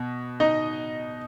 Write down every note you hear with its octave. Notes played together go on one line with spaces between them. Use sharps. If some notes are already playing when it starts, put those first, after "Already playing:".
Already playing: B2
D#4 D#5